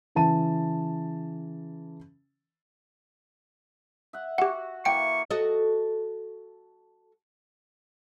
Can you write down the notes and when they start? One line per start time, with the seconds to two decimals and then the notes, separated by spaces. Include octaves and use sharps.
0.15 C#3 E3 A5 D#7
4.13 E5 F#5
4.38 F#4 G4 F#5
4.85 E3 A#3 G5 C#6 C#7
5.31 F#4 A4 D#5